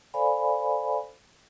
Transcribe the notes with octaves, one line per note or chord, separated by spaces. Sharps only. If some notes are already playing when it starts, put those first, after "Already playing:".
A4 C5 D5 F5 G#5 B5